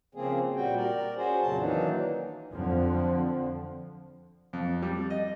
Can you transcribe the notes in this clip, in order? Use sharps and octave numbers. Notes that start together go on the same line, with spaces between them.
C#3 F3 A#3 C4 G#4
A#2 G3 F#4 G5
A#4 D5
C#4 F#4 G#4 C5
F2 A#2 C#3 F#3 A5
D#3 E3 F#3 A#3 D4 D#4
F2 D3 F3
F2
G3
D#5